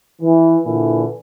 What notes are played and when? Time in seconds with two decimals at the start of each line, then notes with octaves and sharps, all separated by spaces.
0.21 E3
0.65 A#2 D3 E3